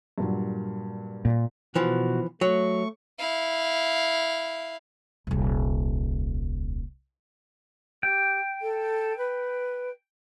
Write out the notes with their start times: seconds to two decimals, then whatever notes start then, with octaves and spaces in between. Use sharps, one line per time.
0.18 G2 A#2 F#3
1.25 A#2
1.75 B2 E3 F3 F#4
2.41 F#3 A3 C#6
3.19 E4 F5
5.27 D#1 C2
8.03 G4 G5
8.61 A4
9.17 B4